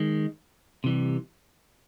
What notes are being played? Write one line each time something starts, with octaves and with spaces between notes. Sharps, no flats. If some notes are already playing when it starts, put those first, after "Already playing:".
Already playing: D#3 G#3
C3 E3 G3